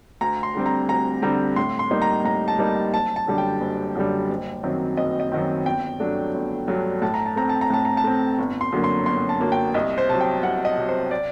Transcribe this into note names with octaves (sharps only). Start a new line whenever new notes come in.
D2 A#5
C6
D3 G3 C4
A#5
D2 A#5
D3 G3 C4 A#5
A2 C6
C6
G3 A#3 D#4
A#5
A2 A#5
A5
G3 A#3 D#4
F#1 A5
A5
F#2 D3 G3
G5
F#1
F#2 D3 G3
F#1
F#2 D#3 F#3 C4
F#1 D#5
D#5
F#2 D#3 F#3 C4
G1 G5
G2 F#3 A3 D4
G1
G2 F#3 A3 D4
A2 A5
A#5
A5
A3 C4 A#5
A5
A#5
A2 A5
A#5
A5
A3 C4
G1
C6
F#2 D3 F#3 A#3
C6
G1 C6
A5
F#2 D3 F#3 A#3
G5
C2 D#5
C5
C3 F#3 A5
G5
C2 F#5
D#5
C3 F#3
C5
D5